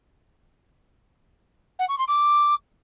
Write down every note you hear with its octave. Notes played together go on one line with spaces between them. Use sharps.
F#5
C#6
C6
D6